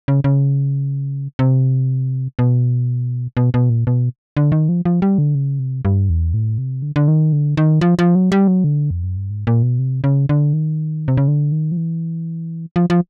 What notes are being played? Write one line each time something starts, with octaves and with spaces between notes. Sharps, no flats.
C#3
C#3
C3
B2
B2
B2
A#2
B2
D3
D#3
F3
F3
G3
D3
C#3
C3
G2
E2
A2
C3
D3
D3
D#3
D3
D#3
F3
F3
F#3
G3
F#3
D3
F2
F#2
G2
G#2
A#2
B2
C3
C#3
D3
D#3
C3
C#3
D3
D#3
F3
E3
F3
F3